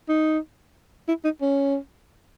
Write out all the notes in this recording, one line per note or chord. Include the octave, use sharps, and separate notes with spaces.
D#4
E4
D#4
C#4